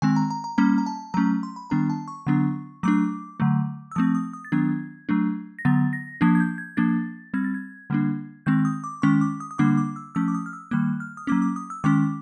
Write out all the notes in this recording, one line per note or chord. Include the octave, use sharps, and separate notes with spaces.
D#3 G#3 C4 G#5
A#5
A#5
A#5
G3 A#3 C#4 A#5
A#5
A5
F#3 A3 C#4 A#5
C6
B5
D#3 G3 B3 D4 A#5
A5
C#6
D3 F#3 B3 D4
F#3 A3 D4 D6
D3 F#3 A3
E6
F3 A3 C4 D#6
D#6
D#6
A6
D#3 F#3 B3 D4 G#6
F#3 A3 D4
A#6
D3 F#3 B3 A6
A#6
F3 A#3 D4 G#6
G#6
G6
G#6
F3 A#3 D4 A6
G3 C4 G#6
A6
G#6
D3 G3 A#3 D4
D#3 G#3 C4 G6
D#6
D6
D#3 G#3 C#4 C#6
D6
D#6
D#6
D3 G3 A#3 D4 D6
D6
E6
F3 A3 C#4 E6
D6
D#6
F6
E6
D#3 G3 A#3 F#6
F6
D#6
F#3 A#3 C#4 D6
D6
D#6
E6
D#3 G#3 C#4 D6